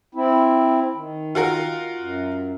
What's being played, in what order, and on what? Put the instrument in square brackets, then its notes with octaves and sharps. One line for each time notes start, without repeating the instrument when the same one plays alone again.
[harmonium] C4 E4
D#3
[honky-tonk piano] F4 F#4 A#4
[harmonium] F#2